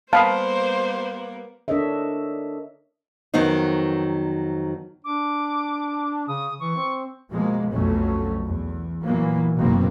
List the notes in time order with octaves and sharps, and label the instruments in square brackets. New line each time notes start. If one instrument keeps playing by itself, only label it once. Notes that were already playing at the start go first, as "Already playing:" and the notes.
[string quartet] G3 A#3 B3 [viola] C5 [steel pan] F5 B5 D#6 [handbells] A5
[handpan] D4 A4 A#4 C#5 D#5 E5
[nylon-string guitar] F2 D#3 F#3 B3 C4 D#4
[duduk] D4 [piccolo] D6
[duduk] C#3 [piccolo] D#6
[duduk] E3 [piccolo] C#6
[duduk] C4
[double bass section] B2 F3 G#3 A#3
B1 F2 B2 F#3 A3 C#4
E2
A#2 E3 F#3 A#3 B3
F#1 B2 D#3 F#3 A#3 C4